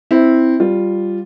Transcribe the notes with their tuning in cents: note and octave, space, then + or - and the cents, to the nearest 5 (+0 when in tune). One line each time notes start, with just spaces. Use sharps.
C4 +0 E4 -10
G3 +0 F4 +0